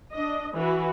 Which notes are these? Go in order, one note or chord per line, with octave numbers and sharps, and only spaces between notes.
D4 D#5
E3 F#4 B4